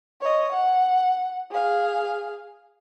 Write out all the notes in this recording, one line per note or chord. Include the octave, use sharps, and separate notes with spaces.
C#5 D#5
F#5
G#4 F5